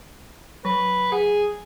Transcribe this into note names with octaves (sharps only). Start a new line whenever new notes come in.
F#3 B4
G#4 F#5